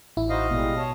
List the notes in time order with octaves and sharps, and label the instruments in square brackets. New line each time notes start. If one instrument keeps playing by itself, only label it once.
[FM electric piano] A1 E4
[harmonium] D#4 F#4 C5 [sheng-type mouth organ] D#5 F5
[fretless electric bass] B2 [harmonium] G3 G#3
[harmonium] C#5 A5